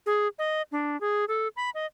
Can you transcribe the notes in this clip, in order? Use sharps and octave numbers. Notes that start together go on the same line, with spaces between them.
G#4
D#5
D4
G#4
A4
B5
D#5